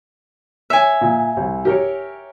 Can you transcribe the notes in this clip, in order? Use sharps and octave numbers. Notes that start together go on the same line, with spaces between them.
C#5 E5 G#5
A#2
C2
G4 A#4 C#5